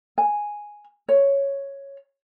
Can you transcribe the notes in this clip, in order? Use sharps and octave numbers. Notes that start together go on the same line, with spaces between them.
G#5
C#5